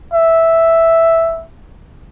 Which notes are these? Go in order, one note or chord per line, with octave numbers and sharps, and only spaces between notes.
E5